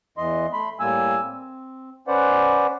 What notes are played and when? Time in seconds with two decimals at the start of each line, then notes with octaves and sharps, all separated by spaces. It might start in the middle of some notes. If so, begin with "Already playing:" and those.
0.18 E2 E3 D#5 C6
0.53 A3 B5 C6
0.80 A2 G3 A#3 G#5 E6
1.21 C4
2.07 C#4 B4 C5 D5 F#5